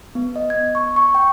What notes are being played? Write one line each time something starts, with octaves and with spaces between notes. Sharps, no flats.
B3
D#5
G#6
C#6
C#6
G5